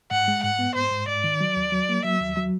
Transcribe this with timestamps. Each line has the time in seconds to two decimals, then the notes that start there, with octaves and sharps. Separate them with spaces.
0.11 G#2 F#5
0.28 G#3
0.43 G#2 F#5
0.59 B3
0.75 G#2 C5
0.91 G#2
1.08 G#2 D5
1.24 D#3
1.41 F#3
1.56 D#2
1.72 F#3
1.89 A#3
2.04 F#3 E5
2.21 D#2
2.37 F#3